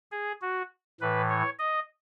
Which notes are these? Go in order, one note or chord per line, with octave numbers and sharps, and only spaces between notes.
G#4
F#4
A2 E3 B4
C#5
D#5